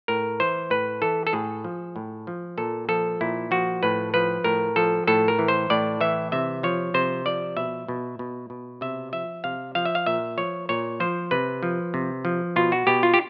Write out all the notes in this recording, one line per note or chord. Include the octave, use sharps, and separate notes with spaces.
A2 A#4
E3 C5
A2 B4
E3 A4
A4
A2 G#4
F3
A2
F3
A#2 A4
F3 A4
A#2 E4
F3 F#4
A2 B4
F3 B4
A2 A#4
F3 A4
A2 A4
A#4
E3
C5
A2 D5
E3 E5
C3 E5
F3 C#5
C3 C5
F3 D5
B2 E5
B2
B2
B2
C3 E5
F3 E5
C3 F5
F3 F5
E5
F5
A#2 E5
F3 C#5
A#2 C#5
F3 C5
C3 B4
F3
C3
F3
B2 F4
F#4
B2 G4
F4
G4